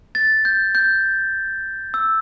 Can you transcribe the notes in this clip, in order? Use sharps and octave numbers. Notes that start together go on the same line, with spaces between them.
A6
G6
G6
E6